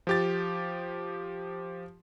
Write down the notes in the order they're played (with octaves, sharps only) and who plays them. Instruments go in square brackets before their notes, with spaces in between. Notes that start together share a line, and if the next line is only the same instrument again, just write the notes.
[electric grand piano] F3 G4 A6